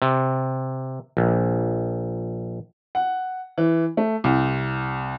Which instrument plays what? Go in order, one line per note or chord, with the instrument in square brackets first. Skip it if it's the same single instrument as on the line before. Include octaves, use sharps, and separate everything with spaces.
[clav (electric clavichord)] C3
A#1
[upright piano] F#5
E3
A3
C2